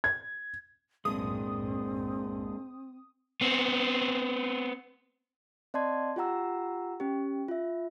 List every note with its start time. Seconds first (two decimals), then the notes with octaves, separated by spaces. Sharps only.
0.04 G#6
1.05 B1 F#2 A2 G#3 A#3 C4 D4 D#6
3.41 B3 C4
5.74 C4 D5 D#5 A5 C6 G#6
6.16 F4 G4 F#5 A#5 E6
7.00 C#4 G4
7.48 F4 E5